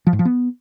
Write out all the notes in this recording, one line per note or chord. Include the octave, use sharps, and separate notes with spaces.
F3
G#2
F3
B3